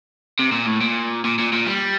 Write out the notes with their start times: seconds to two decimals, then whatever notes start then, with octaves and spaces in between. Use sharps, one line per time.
0.39 C3
0.53 A#2
0.67 A2
0.81 A#2
1.25 A#2
1.39 A#2
1.53 A#2
1.67 G3